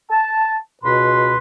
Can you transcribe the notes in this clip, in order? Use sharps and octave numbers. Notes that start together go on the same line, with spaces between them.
A5
C#2 B2 B4 B5 C6